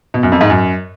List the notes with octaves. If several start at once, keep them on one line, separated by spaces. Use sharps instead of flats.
B2
F#2
F2
G#2
F#2